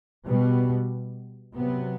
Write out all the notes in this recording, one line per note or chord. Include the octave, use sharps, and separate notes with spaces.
B2 G3 B3
C3 F#3 B3